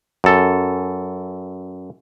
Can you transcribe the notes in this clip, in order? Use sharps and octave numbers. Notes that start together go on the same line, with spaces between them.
F#2 A4